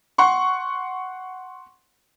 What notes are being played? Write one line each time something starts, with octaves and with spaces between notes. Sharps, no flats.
F#5 C6 C#6